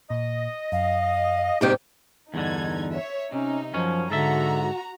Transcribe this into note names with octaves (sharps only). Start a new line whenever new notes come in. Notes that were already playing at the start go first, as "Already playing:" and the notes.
A#2 D#5
F#2 F5
G#2 C3 D#3 G3 G4
E2 G2 D3 D#4 G#6
C#5 E5
C3 C#4 D#4
F#2 F3 C#4
G#2 D3 F#4 A4 E5 A#5